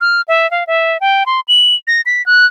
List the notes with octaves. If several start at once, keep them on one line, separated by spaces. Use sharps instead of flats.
F6
E5
F5
E5
G5
C6
F#7
A#6
B6
F#6